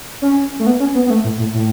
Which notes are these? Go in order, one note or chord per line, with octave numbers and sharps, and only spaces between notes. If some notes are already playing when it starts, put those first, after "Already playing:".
C#4
A3
B3
C#4
B3
B3
A3
A2
A2
A2